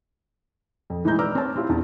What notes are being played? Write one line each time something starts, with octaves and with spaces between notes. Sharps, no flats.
F2
A2 E3 G#3 A3 A#5 G6
B4 D5 A#5 D6 E6 F6
C4 C#5 A5
C4 E4 F4 G4
E2 D4 A5